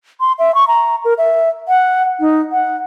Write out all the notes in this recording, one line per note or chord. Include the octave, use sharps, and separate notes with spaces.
C6
E5
C#6
A#5
A#4
E5
F#5
D#4
F#5